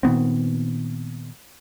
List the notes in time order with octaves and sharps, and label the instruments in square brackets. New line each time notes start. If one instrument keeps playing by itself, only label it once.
[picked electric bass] A#2 D#3 B3 C4